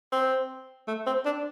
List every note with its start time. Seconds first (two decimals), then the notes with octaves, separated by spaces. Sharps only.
0.12 C4
0.87 A3
1.06 C4
1.25 D4